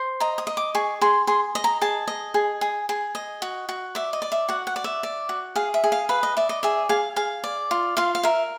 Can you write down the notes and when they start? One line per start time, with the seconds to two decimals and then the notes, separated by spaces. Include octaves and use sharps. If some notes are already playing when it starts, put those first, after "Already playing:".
Already playing: C5
0.20 D#5 A#5
0.38 D#6
0.47 D#5
0.57 D6
0.75 G#4 C#6
1.01 G#4 C6
1.27 G#4 C6
1.55 D#5
1.64 A#5
1.81 G#4 A5
2.08 D#5
2.34 G#4
2.61 G#4
2.89 G#4
3.15 D#5
3.42 F#4
3.69 F#4
3.95 D5 E5
4.13 D#5
4.22 D5
4.32 E5
4.49 F#4 F#5
4.67 F#5
4.76 D5
4.84 E5
5.03 D5
5.29 F#4
5.56 G#4 F5
5.74 E5
5.84 G#4
5.92 F5
6.09 B4 F5
6.23 D#5
6.37 D5 E5
6.49 D#5
6.63 G#4 E5
6.89 G#4 F5
7.16 G#4 F5
7.44 D5
7.71 F4
7.97 F4 F5
8.15 F5
8.23 A#4 E5